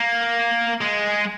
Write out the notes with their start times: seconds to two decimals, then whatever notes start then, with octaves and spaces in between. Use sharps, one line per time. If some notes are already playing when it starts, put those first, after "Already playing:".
Already playing: A#3
0.81 G#3